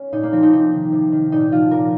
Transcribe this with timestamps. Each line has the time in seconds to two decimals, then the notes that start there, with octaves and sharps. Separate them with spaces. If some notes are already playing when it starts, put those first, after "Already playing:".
Already playing: C#4
0.12 A#2 D#4
0.23 A#3
0.33 F3 C4
0.43 D#4
0.53 C3 D#4
0.73 D#3
0.92 C3
1.12 D#3
1.32 A#2 D#4
1.52 F3 F4
1.71 A#2 A#4